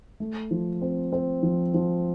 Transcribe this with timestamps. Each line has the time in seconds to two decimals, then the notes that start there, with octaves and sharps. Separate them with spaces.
0.20 A3
0.51 F3
0.82 C4
1.12 C4
1.43 F3
1.74 F3